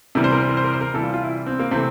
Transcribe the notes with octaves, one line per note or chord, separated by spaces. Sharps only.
C3 E3 G3 A#4
C5
A#4
C5
A#4
C5
A#4
C5
A#4
C3 E3 G3 A4
F4
F4
E4
C4
A#3
C3 E3 A3 C4